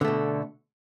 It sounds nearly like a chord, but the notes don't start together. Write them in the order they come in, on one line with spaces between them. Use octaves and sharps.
D3 A3 B2